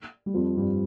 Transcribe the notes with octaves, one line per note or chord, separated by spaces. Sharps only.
G3
F2 F3
G2 G3